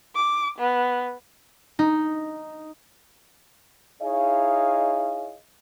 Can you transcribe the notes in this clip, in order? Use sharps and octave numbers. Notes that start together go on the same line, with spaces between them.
D6
B3
D#4
D#4 E4 G#4 C#5 D#5 F5